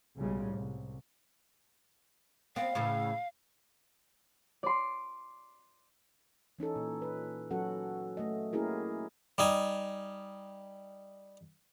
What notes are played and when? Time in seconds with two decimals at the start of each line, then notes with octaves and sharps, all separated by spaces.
0.18 B1 A2 C#3 G3 G#3
0.52 C2
2.56 B3 C4 F5
2.75 A2 C#3 E3
4.63 D5 C6
6.59 E3 C#4 D#4 A4
6.76 A#2
7.02 B4
7.51 F#3 C#4 F#4 A4 F#5
8.17 A3 D#5
8.53 A#3 C#4 E4 G4 G#4 A#4
9.38 G3 D#4 G#5